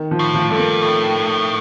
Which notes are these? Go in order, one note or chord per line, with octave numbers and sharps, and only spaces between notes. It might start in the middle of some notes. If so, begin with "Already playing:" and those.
Already playing: D#3
F3
A2
F3
G2 A3
A#3
A2 A3